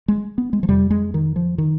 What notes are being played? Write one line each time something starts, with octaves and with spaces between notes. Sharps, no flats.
G#3
B3
G#3
F3
F2 C3 G3
G#3
D#3
F3
D#3